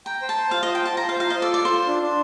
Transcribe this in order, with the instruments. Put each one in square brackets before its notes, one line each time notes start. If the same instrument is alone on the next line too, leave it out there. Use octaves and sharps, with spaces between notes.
[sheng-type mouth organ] G5 [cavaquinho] A#5
[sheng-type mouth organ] C5
[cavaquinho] A5
[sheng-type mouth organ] C5
[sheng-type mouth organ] F4 [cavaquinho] F5
[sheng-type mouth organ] C5 [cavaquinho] D#5
[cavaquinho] G5
[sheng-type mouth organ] F4 [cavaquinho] A5
[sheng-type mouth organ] F4 [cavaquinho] A#5
[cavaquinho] F5
[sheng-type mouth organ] C5
[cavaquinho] F5
[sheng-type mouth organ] F4 [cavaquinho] D#5
[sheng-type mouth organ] A4 [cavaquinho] D5
[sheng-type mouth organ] F4 [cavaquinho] D5
[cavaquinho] C5
[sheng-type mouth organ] F4
D4
D4